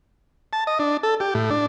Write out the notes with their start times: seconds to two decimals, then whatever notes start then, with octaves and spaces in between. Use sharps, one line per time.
0.53 A5
0.67 D#5
0.79 D4
1.03 A4
1.20 G4
1.35 A2
1.50 D4